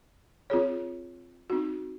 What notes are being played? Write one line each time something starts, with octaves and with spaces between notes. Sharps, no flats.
C4 F4 G#4 C#5
C4 D#4 F#4